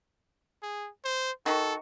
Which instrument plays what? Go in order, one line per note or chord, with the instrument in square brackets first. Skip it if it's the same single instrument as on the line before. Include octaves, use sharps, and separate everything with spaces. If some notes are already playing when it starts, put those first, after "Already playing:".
[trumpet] G#4
C5
[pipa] D#3 F#4 [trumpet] A4